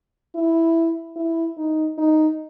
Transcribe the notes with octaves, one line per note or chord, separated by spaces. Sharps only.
E4
E4
D#4
D#4